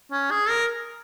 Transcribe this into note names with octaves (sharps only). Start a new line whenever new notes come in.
C#4
G#4
A#4